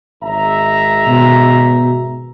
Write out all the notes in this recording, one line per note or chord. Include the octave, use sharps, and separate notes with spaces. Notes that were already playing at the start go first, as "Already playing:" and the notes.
G#1 E5 A#5
B2